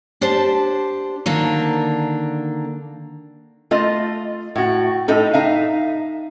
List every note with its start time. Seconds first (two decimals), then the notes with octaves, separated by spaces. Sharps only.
0.21 D4 G4 C5 A5
1.26 D3 D#3 A#3 D4
3.71 A3 F4 D#5
4.56 A2 F#4
5.08 A2 D#4 A4
5.33 D#4 E5 F5